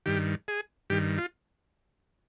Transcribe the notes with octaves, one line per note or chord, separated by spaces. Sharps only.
G2 D#3 G4
G#4
G2 D#3 G4
F4